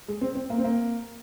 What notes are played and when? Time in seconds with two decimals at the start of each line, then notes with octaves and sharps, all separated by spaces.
0.08 G#3
0.21 C4
0.35 C4
0.50 A#3
0.58 C4
0.64 A#3